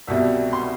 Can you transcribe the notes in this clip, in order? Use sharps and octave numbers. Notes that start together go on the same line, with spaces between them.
C2 B2 G3 E5
C6